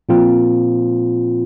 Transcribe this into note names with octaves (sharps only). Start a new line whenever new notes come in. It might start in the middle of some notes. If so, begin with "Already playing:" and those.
A#2 F3 C4 F4